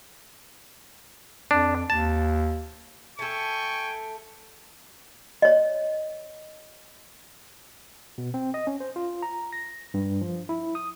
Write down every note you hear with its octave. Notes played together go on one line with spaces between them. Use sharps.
F2 D4
D#2 A5
A3 A4 G5 G#5 C#6
C#5 D#5
B2
C4
D#5
C#4
C5
F4
A#5
A#6
G2
F3
E4
D#6